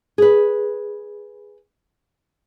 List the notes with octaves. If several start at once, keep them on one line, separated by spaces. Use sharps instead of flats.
G#4 B4